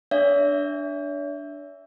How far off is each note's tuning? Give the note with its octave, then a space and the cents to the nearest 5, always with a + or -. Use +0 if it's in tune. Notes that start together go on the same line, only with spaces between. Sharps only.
D4 -5 C#5 +45 E5 +0